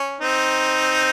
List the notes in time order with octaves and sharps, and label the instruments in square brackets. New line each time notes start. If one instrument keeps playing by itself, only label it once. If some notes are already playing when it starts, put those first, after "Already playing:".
Already playing: [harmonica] C#4
C4 D#4